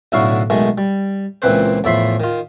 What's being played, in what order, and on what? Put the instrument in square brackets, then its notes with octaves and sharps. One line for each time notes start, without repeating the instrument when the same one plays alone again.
[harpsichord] B1 A2 D3 E4 F5 C#6
B1 D#3 G#3 A3
G3
C#2 A#2 E3 C4 B4 C5
E2 A2 F3 E5 B5 C6
D#3 F4